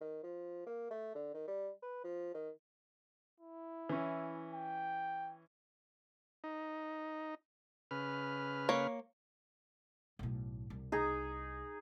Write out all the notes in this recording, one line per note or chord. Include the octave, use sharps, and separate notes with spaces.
D#3
F3
A#3
A3
D3
D#3
G3
B4
F3
D#3
E4
E3 C#4
G5
D#4
C#3 B4 F6
A#3 C#5
B1 A2
C2
D#4 G#4